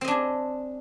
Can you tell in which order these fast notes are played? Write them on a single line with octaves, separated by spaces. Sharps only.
C4 D#5 D4 G#4